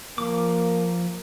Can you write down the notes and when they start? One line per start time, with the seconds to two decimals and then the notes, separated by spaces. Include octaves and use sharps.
0.18 F3 A#3 D6